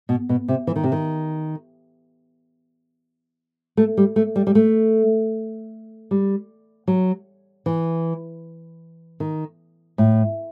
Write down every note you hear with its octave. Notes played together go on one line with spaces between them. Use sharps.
B2
B2
C3
E3
D#3
C3
D#3
A3
G3
A3
G3
G3
A3
G3
F#3
E3
D#3
A2